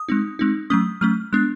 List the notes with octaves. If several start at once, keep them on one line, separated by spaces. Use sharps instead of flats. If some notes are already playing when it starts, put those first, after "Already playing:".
Already playing: D#6
G#3 C4 D#4
G#3 C4 D#4
F#3 A3 C#4 D#6
F#3 A3 C#4 F6
G#3 B3 D4 F#6